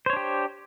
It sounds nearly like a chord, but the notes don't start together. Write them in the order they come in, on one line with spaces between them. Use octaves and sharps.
C5 C#5 D4 G4